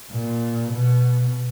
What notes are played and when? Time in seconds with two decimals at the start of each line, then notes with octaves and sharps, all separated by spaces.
0.12 A#2
0.72 B2